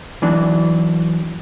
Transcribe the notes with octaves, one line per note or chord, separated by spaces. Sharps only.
E3 F#3 D4